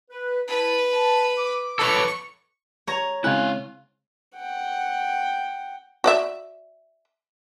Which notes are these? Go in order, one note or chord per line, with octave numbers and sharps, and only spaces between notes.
B4
E4 B4 A5
A5
D6
A4 B4 C#5 C#6
C#5 A#5
C#3 G#3 C4 E4 F5 G#5 F#6
F#5 G5
F#4 D5 E5